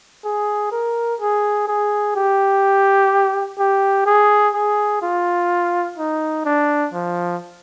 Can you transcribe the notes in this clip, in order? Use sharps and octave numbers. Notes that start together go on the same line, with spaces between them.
G#4
A#4
G#4
G#4
G4
G4
G#4
G#4
F4
D#4
D4
F3